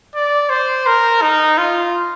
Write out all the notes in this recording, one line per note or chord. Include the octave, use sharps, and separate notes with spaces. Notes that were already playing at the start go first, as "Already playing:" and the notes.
D5
C5
A#4
D#4
F4